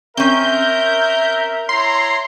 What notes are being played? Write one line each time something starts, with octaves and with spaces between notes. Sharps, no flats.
C4 C#4 A#4 E5 G6
E4 C#5 A#5 C6